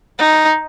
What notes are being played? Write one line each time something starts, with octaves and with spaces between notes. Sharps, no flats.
D#4